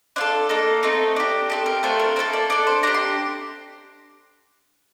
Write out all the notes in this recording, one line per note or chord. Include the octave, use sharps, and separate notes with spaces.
D4 F4 A4 C5
A#3 D#4 A4
A3 C4 D#4
D4 G4
C4 D#4 G4 A4
A#4
A3 D4 F4 A4 C5
A#4
A#3 F4 A4 C5
D5
D4 A4 D5
C5
D4 G4 A#5
C6